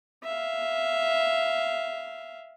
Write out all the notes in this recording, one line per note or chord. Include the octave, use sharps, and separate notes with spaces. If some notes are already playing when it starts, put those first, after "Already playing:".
E5 F5